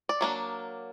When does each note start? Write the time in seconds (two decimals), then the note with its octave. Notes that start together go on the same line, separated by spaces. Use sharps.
0.09 D5
0.21 F#3 A#3 D4